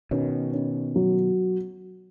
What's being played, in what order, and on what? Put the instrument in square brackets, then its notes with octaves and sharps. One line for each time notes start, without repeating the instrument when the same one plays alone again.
[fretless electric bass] B2 D#3 [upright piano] C#4
[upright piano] C#4
F#3